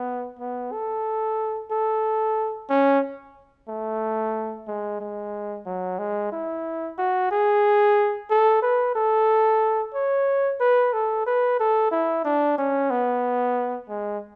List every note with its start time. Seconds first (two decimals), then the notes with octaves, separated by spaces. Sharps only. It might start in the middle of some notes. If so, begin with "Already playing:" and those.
Already playing: B3
0.39 B3
0.72 A4
1.71 A4
2.70 C#4
3.68 A3
4.67 G#3
5.00 G#3
5.66 F#3
5.99 G#3
6.32 E4
6.98 F#4
7.31 G#4
8.30 A4
8.62 B4
8.95 A4
9.94 C#5
10.60 B4
10.93 A4
11.26 B4
11.59 A4
11.91 E4
12.25 D4
12.58 C#4
12.91 B3
13.89 G#3